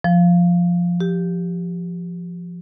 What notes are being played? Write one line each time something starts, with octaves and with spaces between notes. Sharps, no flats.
F3
G4